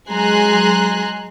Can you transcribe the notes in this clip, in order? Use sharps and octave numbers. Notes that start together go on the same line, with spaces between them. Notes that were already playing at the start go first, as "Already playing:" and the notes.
F#3 G#3 G#5 A#5 C6 F#6